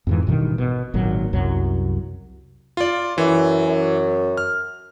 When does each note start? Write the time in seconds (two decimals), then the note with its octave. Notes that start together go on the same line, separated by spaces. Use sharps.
0.07 F2 G#2 E3
0.27 A1 G2 B2 D#3
0.58 B2
0.94 G#1 A#2 F#3
1.33 C2 F#2 F#3
2.77 F4 D5
3.18 F#2 E3
3.67 F#2
4.37 F6